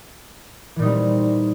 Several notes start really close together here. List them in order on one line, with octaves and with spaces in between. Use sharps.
E3 A#2 D#4 G3 C4